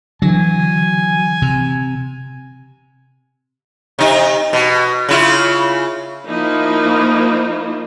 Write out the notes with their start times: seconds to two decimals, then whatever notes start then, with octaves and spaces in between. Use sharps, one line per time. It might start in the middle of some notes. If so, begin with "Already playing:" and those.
0.22 D3 E3 F#3 G#5
1.42 C3
3.99 C3 D#4
4.53 B2
5.09 C#3 E4 F4
6.28 F3 A#3 D#4 E4